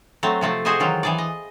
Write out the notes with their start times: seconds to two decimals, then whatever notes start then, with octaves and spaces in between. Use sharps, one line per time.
0.23 F#3 A3 C4
0.41 C3 F3 A3 C4
0.65 F#4 G#4 C5 D#5 E5 G#5
0.80 D#3 E3 F#3 F4
1.03 E3 G#4 D5
1.18 D#5